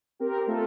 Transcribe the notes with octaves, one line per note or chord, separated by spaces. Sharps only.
C4 G4 A#4
A3 F4 A4